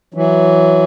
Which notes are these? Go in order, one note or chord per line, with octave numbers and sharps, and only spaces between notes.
E3 F#3